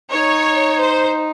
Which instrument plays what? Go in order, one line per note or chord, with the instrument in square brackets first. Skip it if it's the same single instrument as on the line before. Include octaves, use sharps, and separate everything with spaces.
[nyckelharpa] D#4 [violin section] C#5
[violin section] C5